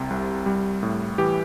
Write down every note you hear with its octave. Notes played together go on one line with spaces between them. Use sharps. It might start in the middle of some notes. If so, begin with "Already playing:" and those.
Already playing: C2 C3
C2
G3
A2
E3 G4